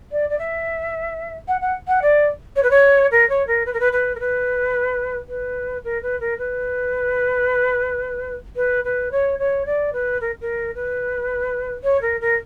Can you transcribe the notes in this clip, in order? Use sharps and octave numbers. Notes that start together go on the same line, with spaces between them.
D5
D5
E5
F#5
F#5
F#5
D5
C#5
B4
C#5
A#4
C#5
A#4
B4
A#4
B4
B4
A#4
B4
B4
A#4
B4
A#4
B4
B4
B4
C#5
C#5
D5
B4
A#4
A#4
B4
C#5
A#4
A#4